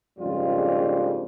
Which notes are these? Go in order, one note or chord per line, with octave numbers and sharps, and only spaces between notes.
A#1 F2 G#2 C#3 G3 F4